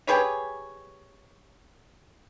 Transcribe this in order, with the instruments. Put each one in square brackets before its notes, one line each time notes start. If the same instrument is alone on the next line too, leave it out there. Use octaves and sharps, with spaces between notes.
[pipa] G4 G#4 B4 C#5